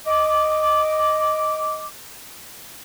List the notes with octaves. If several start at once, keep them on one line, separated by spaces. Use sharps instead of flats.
D#5 D6